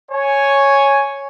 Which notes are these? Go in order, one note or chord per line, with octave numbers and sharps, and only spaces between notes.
C#5 G#5